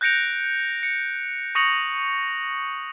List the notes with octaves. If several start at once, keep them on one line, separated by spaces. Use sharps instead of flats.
F#6 G6 A#6 C#7 D7 F7
C#7
C#6 D#6 A#6 C#7 F7 F#7